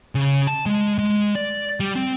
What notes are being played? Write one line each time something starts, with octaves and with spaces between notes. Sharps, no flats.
C#3
A5
G#3
G#3
D5
G3
C4